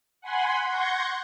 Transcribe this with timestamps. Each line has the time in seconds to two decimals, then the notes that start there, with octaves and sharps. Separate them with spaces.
0.21 F#5 G#5 B5 C6
0.68 F#5 C6 C#6 G6 G#6 A#6